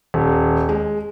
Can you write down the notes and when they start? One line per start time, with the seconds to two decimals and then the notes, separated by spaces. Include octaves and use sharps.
0.14 D#1
0.69 G#3